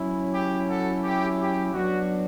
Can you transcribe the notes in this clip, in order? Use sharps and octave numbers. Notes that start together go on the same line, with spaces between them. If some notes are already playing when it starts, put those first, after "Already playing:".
Already playing: F#3 C#4 E4
G4
F#4 A4
G4
G4
F#3 B3 D4 F#4